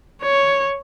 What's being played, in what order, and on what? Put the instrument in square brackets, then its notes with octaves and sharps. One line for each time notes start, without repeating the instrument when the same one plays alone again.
[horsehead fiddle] C#5